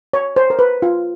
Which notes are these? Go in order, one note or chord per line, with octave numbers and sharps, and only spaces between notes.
C#5
C5
A#4
B4
F4